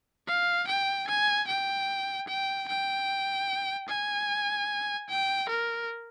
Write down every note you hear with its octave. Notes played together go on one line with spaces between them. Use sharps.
F5
G5
G#5
G5
G5
G5
G#5
G5
A#4